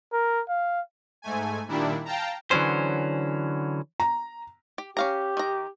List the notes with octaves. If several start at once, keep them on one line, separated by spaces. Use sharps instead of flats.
A#4
F5
G#2 A3 G#5
A#2 D#3 G3 D4 E4
F5 G5 A5 A#5
D3 E3 F#3 C#4 C5
A#5
G4
C#4 G4 F5 A#5
D#3 A#5